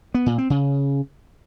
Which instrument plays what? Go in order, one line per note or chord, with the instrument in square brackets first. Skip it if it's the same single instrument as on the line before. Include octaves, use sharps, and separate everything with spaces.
[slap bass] B3
A#2
C4
C#3